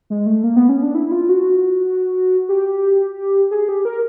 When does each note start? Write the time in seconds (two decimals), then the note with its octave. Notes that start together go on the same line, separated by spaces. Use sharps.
0.10 G#3
0.26 A3
0.44 A#3
0.56 B3
0.69 C#4
0.83 D4
0.95 E4
1.12 F4
1.29 F#4
2.49 G4
3.51 G#4
3.69 G4
3.85 A#4